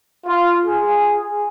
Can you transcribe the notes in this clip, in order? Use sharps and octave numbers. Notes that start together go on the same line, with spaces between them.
F4
G#4